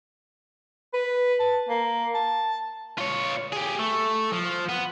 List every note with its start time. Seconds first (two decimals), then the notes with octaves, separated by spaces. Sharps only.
0.94 B4
1.40 A5
1.69 A#3
2.15 A5
2.98 F4 C#5
3.53 G4 G#4
3.80 A3
4.32 F3
4.69 B3